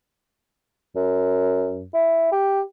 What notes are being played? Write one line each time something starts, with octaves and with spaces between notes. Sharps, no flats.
F#2
E4
G4